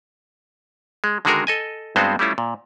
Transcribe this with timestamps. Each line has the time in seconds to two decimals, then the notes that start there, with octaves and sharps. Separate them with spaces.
1.04 G#3
1.25 D3 D#3 G#3 F#4 G#4 A#4
1.47 A4 D#5 G#5
1.96 G2 G#3 B3 C4 F#4 C5
2.19 G3 A3 C#4 E4 F4
2.38 A#2